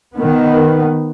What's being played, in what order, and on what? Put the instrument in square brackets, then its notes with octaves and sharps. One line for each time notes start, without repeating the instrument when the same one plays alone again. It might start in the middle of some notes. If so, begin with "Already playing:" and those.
[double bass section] D#3 B3